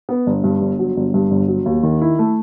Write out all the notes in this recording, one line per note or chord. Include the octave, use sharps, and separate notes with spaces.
B3
G1
G2
G1
F#3
G1
G2
G1
F#3
D#2
D#3
E4
A3